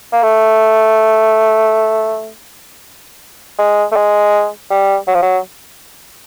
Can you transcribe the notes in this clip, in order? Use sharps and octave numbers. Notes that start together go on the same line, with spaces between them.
A#3
A3
G#3
A3
G#3
G3
F#3
F3
F#3